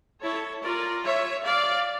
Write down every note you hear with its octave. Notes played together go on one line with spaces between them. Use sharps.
E4 A4 C#5
F4 A#4 D5
C#5 E5
D5 F5